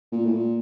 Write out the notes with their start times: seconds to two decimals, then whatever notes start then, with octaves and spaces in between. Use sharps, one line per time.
0.12 A#2
0.25 A2
0.32 A#2